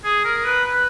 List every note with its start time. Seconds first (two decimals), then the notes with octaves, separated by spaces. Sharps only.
0.04 G#4
0.24 A#4
0.44 B4
0.65 B4